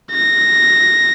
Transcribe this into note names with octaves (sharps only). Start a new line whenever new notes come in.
A#6